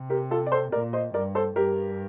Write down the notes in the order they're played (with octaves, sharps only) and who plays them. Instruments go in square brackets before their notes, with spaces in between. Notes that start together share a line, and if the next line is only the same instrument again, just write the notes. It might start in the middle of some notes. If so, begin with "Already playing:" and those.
Already playing: [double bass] C3
[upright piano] G4 A#4
F4 A4
D5
A4 C5
[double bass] A#2 [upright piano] A#4 D5
[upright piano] C5 D#5
[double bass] G2 [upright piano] A#4 D5
[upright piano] A4 C5
[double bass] G2 [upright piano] G4 A#4